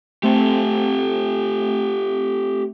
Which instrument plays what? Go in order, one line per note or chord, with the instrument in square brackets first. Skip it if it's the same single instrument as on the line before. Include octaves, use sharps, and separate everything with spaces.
[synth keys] A3 C4 [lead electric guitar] G4 A4